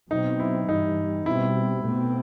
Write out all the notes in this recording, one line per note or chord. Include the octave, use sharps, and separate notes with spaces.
B2 F#3 C4 D#4
E4
G2 E3 G3 D#4
B2 G3 C4 E4
B2 A3 C4